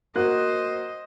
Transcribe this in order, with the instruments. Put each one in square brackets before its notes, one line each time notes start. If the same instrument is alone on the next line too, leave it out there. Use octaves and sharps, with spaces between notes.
[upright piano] A#3 F#4 F#6 [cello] C5 D#5